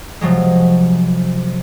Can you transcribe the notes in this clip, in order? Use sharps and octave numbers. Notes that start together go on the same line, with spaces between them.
C3 F3 F#3 G#3